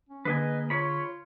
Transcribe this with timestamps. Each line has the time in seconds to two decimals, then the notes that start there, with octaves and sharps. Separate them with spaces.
0.09 C#4
0.25 D3 A#3 G#4 B4 D#5 G#5
0.70 F4 C#5 B5